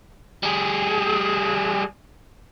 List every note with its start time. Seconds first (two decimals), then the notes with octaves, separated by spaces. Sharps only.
0.43 G3 G#4